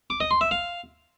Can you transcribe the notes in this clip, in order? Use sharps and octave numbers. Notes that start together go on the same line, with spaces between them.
D6
D#5
C6
E5
F5